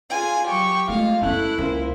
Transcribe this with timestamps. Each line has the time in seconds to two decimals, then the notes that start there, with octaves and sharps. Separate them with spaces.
0.11 F4 G#4 G#5
0.48 F#3 G4 C#6
0.89 G#3 A3 F4 F5
1.21 F#2 A3 C#4 E4 F#6
1.58 C#2 A#3 C5